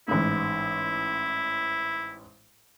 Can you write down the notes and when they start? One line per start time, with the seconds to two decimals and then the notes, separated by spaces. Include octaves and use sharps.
0.08 A1 G#2 E4